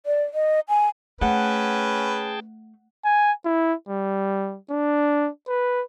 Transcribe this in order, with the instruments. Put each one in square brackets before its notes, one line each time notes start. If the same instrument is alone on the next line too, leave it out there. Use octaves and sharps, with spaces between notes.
[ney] D5
D#5
G#5
[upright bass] A3 [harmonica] C#4 B4 [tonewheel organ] G#4 G5 A5 [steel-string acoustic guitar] F#5
[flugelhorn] G#5
E4
G3
D4
B4